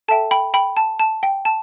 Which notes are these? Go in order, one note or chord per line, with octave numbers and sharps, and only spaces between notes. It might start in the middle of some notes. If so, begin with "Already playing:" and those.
A4 E5 G5 A5
G5 B5
G5 B5
A5
A5
G5
A5